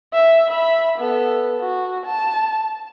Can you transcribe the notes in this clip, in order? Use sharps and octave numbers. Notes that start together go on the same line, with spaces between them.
E5
E5 B5
B3 A4
F#4
A5